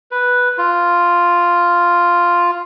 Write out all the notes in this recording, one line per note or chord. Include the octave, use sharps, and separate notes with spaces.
B4
F4